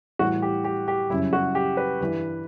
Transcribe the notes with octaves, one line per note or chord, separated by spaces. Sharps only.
A2 E3 G3 F#4
G4
G4
G4
F#2 C#3 G3 E4
F#4
G4
B4
G2 E3 G3